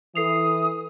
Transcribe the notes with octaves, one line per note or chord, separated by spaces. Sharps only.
E3 A4 D#6 C7 F7